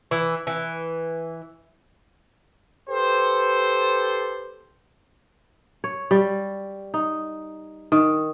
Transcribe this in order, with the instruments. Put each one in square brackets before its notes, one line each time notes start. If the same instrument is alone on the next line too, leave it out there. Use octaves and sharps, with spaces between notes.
[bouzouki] E3
E3
[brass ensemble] G4 A4 B4 C5
[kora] C#5
G3
D#4
D#3